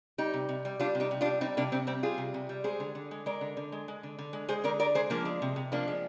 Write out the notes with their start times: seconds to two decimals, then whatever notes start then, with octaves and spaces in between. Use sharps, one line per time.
0.18 G3 D#4 G4
0.34 C3
0.49 C3
0.65 G3
0.80 G3 D4 F4
0.95 C3
1.00 D#4 G4
1.11 C3
1.21 D4 F4
1.26 G3
1.41 G3 C4 D#4
1.57 C3 A#3 D4
1.72 C3 C4
1.87 G3 C4
2.03 G3 F4 G#4
2.18 C3
2.34 C3
2.49 G3
2.64 G#3 G#4 C5
2.80 D3
2.95 D3
3.11 G#3
3.26 G#3 A#4 D5
3.41 D3
3.57 D3
3.72 G#3
3.88 G#3
4.03 D3
4.19 D3
4.33 G#3
4.48 G#3 G#4 C5
4.64 D3 A#4 D5
4.80 D3 A#4 D5
4.95 G#3 G#4 C5
5.10 F3 A#3 D4
5.25 G#3
5.42 C3
5.56 C3
5.72 F3 A#3 D4
5.88 G#3